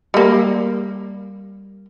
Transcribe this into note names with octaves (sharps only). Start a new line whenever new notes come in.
G3 A#3